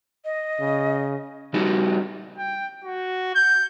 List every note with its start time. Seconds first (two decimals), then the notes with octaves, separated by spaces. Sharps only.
0.25 D#5
0.60 C#3
1.54 G3 D#4 F#4 G4
2.38 G5
2.84 F#4
3.35 G6